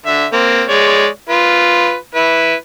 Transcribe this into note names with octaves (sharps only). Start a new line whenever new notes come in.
D3 E5
A#3 C4
G#3 C#5 D5
F4 B4
E4 B4